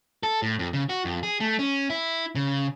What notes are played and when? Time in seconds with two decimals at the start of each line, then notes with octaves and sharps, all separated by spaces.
0.23 A4
0.42 A2
0.59 F2
0.73 C#3
0.89 F#4
1.05 F2
1.23 G#4
1.40 A3
1.59 C#4
1.90 E4
2.35 C#3